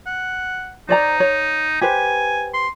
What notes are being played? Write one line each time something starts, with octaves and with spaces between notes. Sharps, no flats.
F#5
D#4 C5 D5 A#5
C#5
G4 B4 C5 G#5
C6